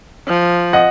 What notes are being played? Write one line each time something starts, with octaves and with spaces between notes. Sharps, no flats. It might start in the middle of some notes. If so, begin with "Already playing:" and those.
F3
D#5 F#5